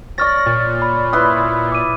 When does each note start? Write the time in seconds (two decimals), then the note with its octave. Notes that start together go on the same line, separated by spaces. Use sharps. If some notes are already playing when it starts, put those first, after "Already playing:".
0.18 C#5 D5 C#6 F6 A6 A#6
0.46 A#2
0.82 B5
1.13 E4 B4 C6 D#6
1.72 D6 D#7